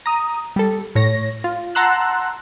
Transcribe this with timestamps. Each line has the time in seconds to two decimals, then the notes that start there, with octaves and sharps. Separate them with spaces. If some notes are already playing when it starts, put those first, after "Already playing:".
0.06 A#5 D#6
0.56 G3 A4
0.95 A2 C#5 A#6
1.44 F4
1.75 F#5 A5 A#5 C6 E6 F#6